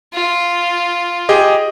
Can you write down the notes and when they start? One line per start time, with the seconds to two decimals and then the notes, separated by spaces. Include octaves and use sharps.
0.13 F4
1.29 G4 G#4 D#5